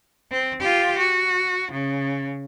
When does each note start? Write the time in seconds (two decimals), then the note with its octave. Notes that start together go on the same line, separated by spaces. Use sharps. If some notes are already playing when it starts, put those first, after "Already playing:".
0.31 C4
0.60 F4 G4
0.98 F#4
1.72 C#3